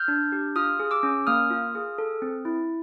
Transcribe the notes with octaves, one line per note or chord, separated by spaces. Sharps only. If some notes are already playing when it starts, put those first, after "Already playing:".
Already playing: F6 G6
D4
G4
F4 D#6 F6
G#4
D6 E6
C#4
A#3 D#6 F6
F4
G#4
A4
C4
E4